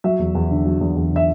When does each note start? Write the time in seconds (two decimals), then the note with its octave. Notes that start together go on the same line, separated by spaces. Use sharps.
0.04 F#3 E5
0.19 E2
0.35 E2
0.51 D3
0.66 F#3
0.81 E2
0.96 E2
1.12 D3 E5